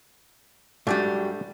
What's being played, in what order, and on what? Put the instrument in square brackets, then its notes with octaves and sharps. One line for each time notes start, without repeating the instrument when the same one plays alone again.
[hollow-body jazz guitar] G#2 F#3 G3 [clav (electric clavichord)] A3 D4 G4